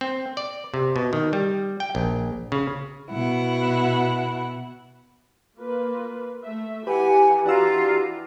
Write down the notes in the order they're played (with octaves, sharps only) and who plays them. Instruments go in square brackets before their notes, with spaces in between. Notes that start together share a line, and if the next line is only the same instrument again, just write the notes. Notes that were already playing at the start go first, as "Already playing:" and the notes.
[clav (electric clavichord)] C4
D5
C3
B2
D#3
G3
G5
A#1
C#3
[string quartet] B2 E4 F#5
[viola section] A#3 F4 B4
A3 E5
[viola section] E3 [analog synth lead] G4 [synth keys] B4 [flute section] F#5 G#5
[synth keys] D4 F#4 E6 [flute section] F4 A#5